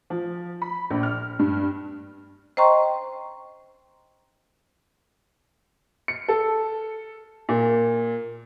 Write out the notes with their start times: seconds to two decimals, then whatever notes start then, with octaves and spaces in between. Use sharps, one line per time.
0.10 F3
0.62 B5
0.90 A#1
1.03 F6
1.39 G2
2.57 C5 D#5 G5 A#5 C6 C#6
6.08 C#7
6.28 A4
7.49 A#2